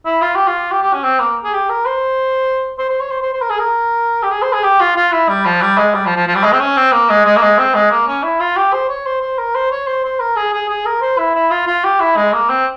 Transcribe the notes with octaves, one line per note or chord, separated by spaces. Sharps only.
E4
F4
G4
F4
G4
G4
C#4
C4
A#3
G#4
G4
A#4
C5
C5
C5
C#5
C5
C5
C5
A#4
G#4
A#4
G4
G#4
C5
G#4
G4
F4
F4
E4
G3
F3
G3
G#3
G3
F3
F3
F3
G3
G#3
C4
C#4
C4
A#3
G#3
G#3
A#3
G#3
C4
G#3
A#3
C#4
E4
F4
G4
C5
C#5
C5
C5
A#4
C5
C#5
C5
C5
A#4
G#4
G#4
G#4
A#4
C5
E4
E4
F4
F4
G4
E4
G#3
A#3
C4